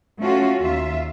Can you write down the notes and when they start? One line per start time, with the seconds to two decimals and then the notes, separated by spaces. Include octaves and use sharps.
0.22 A3 C#4 F4 F#4
0.62 D#2 F4 E5